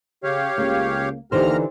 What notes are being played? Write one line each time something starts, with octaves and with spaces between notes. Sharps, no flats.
C#3 G4 C#5 F5
C#2 C#3 A#3
D#2 D3 E3 D#4 G4 C5 A#5 F6